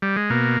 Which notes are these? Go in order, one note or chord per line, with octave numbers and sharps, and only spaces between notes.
G3
G#3
B2 A#3